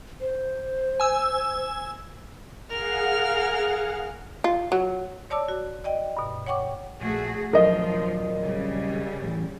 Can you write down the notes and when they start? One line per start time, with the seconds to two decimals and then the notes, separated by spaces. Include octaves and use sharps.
0.21 C5
1.00 G#5 E6
2.70 G#4 A#4 F5 F#5 F6
4.44 F4
4.72 F#3
5.30 C#5 D5 A5 D6 E6
5.48 F#4
5.84 D5 D#5 G5
6.17 G2 B2
6.46 C#5 F#5 G5 C#6 D6
7.01 A#1 A3 F#4 G#4
7.53 D#1 F3 F#3 D4 A#4 D#5
8.45 C#3 G3
9.22 A1 E3